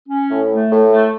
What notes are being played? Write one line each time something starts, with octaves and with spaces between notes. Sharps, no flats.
C#4
A2
A3
A2
A3